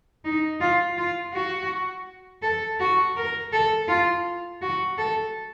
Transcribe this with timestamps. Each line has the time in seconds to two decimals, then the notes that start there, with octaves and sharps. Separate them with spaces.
0.25 D#4
0.60 F4
0.98 F4
1.34 F#4
2.43 A4
2.80 F#4
3.16 A#4
3.52 A4
3.88 F4
4.62 F#4
4.98 A4